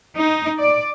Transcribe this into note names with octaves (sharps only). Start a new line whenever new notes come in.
D#4
D5